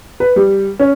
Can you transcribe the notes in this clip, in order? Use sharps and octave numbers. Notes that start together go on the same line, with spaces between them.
B4
G3
C#4